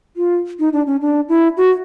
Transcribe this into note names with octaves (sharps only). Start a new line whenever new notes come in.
F4
D#4
D4
C#4
D4
E4
F#4